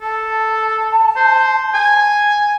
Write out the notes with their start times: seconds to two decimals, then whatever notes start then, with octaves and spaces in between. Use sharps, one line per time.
0.01 A4 A5
1.16 C5
1.74 G#5